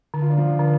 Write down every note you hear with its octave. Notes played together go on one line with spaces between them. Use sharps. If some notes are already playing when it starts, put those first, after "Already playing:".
D3
F4
D4
F3 F4
D3